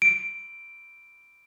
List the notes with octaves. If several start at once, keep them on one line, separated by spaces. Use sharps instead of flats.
D7